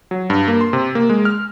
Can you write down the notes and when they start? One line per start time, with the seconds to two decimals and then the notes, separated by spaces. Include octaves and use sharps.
0.11 F#3
0.30 G2
0.48 A#3
0.61 C6
0.73 C3
0.95 A#3
1.10 G#3
1.25 F6